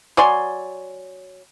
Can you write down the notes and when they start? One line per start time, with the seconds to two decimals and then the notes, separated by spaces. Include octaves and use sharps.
0.17 F#3 D5 G#5 C6